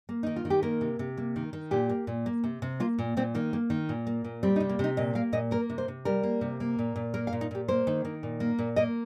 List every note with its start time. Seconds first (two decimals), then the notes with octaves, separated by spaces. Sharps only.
0.09 A#3
0.23 D#3 D#4
0.36 F4
0.45 D#3
0.50 G4
0.63 A#3 A#4
0.81 C3
0.99 C3
1.17 A#3
1.36 D#3
1.53 D#3
1.71 A#2 G4
1.89 A#3
2.07 A#2
2.26 A#3
2.44 C3
2.62 C3
2.80 A#3 F4
2.99 A#2
3.17 A#2 C4
3.35 D#3 A#3
3.53 A#3
3.70 D#3
3.89 A#2
4.07 A#3
4.24 A#2
4.43 G3 C4
4.56 D#4
4.60 C3
4.69 A#3
4.79 C3 D#4
4.97 A#2 D#5
5.15 A#3 F5
5.33 A#2 D#5
5.51 A#3 A#4
5.70 C3
5.78 C5
5.88 C3
6.05 G3 A#4
6.23 A#3
6.41 C3
6.60 A#3
6.79 A#2
6.96 A#2
7.14 A#3 A#4
7.27 F5
7.33 A#2
7.41 D#4
7.51 A#2 G4
7.68 A#3 C5
7.87 D#3
8.05 D#3
8.23 A#2
8.40 A#3
8.59 A#2
8.76 A#3 D#5